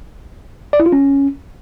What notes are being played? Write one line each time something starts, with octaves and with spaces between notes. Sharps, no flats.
D5
E4
F4
C#4